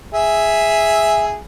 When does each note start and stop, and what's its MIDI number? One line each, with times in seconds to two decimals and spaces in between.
0.14 1.38 68
0.14 1.38 76